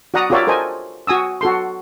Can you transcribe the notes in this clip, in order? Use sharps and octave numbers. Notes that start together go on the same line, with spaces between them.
F#4 D5 F#5 A#5 D#6
F4 G4 A#4 C#5 D5 E5
A4 A#4 C5 D#5 G#5
F#4 G#5 D#6 E6
F#4 A4 C6